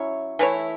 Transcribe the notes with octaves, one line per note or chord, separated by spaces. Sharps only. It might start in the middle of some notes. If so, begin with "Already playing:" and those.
Already playing: F#3 C#4 E4 C#5
E3 A3 E4 C#5